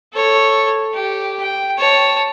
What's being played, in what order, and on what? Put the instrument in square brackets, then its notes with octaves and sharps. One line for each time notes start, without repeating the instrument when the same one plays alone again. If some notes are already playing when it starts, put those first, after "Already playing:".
[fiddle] A4 C#5
G4
G5
C#5 A5